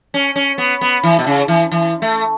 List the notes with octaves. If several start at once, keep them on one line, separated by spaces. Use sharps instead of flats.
C#4
C#4
B3
B3
E3
B2
C#3
E3
E3
A3